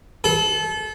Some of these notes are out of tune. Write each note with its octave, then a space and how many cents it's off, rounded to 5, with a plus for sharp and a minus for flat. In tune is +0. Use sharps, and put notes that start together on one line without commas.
A4 -30